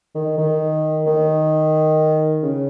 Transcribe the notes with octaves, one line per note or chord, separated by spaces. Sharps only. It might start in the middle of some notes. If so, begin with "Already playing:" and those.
D#3
D#3
D#3
C#3